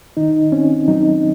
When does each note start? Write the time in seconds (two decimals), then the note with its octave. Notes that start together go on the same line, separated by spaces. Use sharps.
0.17 D#3 D#4
0.52 C4 C#4
0.88 F#3 D#4